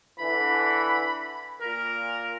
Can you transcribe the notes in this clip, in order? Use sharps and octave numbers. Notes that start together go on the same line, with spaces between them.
D3 E3 B5
A#2 A#4